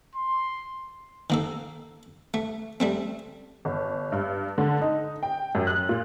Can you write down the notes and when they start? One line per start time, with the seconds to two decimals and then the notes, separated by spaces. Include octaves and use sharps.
0.15 C6
1.30 D#3 A#3 A4
2.34 A3
2.80 G3 A3 C4
3.65 G1
4.12 G2
4.58 D3
4.82 D#4
5.23 G5
5.55 F#2
5.67 F#6
5.89 A#2